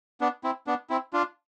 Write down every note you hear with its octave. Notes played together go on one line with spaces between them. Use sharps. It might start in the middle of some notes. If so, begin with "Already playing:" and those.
B3 D4
C4 E4
B3 D4
C4 E4
D4 F4